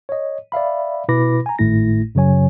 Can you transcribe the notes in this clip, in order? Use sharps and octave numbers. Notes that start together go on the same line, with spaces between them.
C#5 D#5
D5 E5 F5 B5
B2 E4 B4 B5 D6 A#6
G#5 A#5
G#1 A2 A3 E4 A#6
F#2 C#3 F#3 C#5 G#5